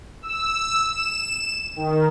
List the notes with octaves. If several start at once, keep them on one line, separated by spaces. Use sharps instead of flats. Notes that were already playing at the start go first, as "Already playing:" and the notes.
E6
E7
D#3